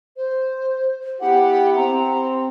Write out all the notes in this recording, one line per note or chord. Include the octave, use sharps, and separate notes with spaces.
C5
B3 E4 G4 F#5
C4 A#5